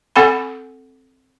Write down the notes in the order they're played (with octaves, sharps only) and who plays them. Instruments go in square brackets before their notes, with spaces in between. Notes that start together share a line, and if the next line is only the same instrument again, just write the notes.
[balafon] C4 A4 F#5 G#5 B5